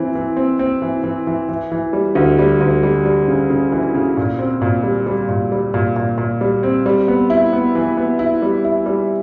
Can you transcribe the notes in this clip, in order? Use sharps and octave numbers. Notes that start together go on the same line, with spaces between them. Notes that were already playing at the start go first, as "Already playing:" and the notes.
Already playing: E3 C4
E3
C4
C4
E3
E3
E3
E3
E3
G3
D2
G3
D2
G3
G3
C#3
C#3
E3
C#3
A#2
C4
A#2
G3
G3
A#2
G3
A#2
A#2
A#2
G3
C4
G3
B3
E4
B3
E3
B3
E4
G3
E4
G3